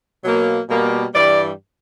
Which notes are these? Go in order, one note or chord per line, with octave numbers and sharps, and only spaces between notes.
B2 F#3 A#3
B2 G3 A#3
G2 E3 G3 D5